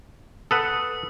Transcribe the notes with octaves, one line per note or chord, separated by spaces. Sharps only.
A4 B4 F#5 D#6